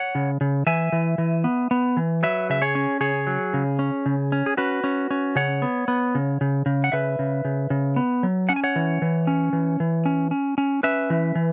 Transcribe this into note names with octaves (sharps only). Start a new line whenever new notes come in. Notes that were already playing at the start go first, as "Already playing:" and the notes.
Already playing: C#5 F#5
C#3
C#3
E3 E5 G#5
E3
E3
B3
B3
E3
F#3 B4 E5
C#3 E5
G#4 C#5
C#4
C#3 G#4 C#5
F#3
C#3
C#4
C#3
C#4
G#4
C#4 F#4 B4
C#4
C#4
C#3 C#5 F#5
B3
B3
C#3
C#3
C#3
F#5
C#3 B4 E5
C#3
C#3
C#3
B3
F#3
C#4 F#5
G#5
C#5 F#5
E3
E3
C#4
E3
E3
C#4
C#4
C#4
C#4 B4 E5
E3
E3